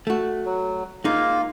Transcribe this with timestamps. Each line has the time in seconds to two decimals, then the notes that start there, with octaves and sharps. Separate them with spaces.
0.07 A3 F#4
0.45 F#3
1.04 G#3 A#3 D#4 F4 F5